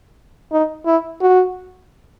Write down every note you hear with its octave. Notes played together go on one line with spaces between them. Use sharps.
D#4
E4
F#4